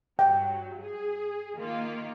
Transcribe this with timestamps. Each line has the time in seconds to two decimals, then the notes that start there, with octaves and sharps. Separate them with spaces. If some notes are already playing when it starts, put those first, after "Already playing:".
0.19 G2 F#3 G5
0.80 G#4
1.55 D#3 A#3 F4